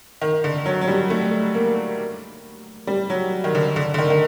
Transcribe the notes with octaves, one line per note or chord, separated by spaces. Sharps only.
D#3
D3
F#3
F#3
G3
A3
A#3
G3
F#3
D#3
D3
D3
D3
D#3
D#3